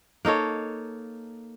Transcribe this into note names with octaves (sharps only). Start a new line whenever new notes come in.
A#3 D#4 A4 C#5